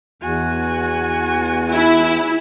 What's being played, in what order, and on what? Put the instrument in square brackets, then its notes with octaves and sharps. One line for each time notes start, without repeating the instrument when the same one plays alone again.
[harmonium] E2 [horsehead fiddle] F#4 G#5
[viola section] E4